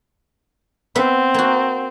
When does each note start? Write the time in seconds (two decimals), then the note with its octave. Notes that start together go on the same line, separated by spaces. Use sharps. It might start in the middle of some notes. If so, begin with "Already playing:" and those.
0.95 B3 C4 E5
1.34 A#3 F#4